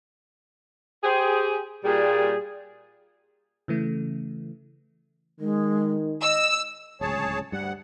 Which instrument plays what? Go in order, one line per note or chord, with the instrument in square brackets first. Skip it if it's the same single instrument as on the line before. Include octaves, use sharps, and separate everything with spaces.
[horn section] G4 G#4 [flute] C5
[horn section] A#2 G3 [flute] G#4
[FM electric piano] C#3 E3 A3
[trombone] D#3 [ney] G#3
[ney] D#5 [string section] E6
[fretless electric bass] D1 C#2 [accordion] G#4 C#5 A5
[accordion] D2 F#5 [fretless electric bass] G2 G3